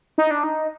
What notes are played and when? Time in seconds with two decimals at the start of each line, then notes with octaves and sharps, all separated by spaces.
0.18 D#4
0.31 D4
0.43 D#4